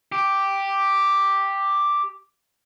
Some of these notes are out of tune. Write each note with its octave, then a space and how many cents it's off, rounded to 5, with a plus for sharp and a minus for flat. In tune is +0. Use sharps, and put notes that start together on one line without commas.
G4 +0